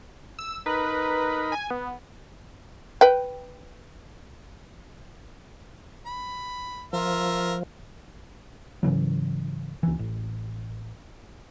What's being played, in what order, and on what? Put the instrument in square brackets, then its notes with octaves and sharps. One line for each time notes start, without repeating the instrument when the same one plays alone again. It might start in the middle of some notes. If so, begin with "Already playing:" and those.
[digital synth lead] E6
[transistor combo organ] D#4 A#4 B5 [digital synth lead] B4
[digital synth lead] G#5
B3
[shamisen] B4 G5
[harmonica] B5
[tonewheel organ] F3 [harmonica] F4 A#4 E5
[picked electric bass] G#2 C#3 E3 F#3
C#2 E3
A1